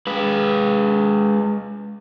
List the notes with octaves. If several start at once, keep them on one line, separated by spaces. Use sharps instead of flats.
G#3 B4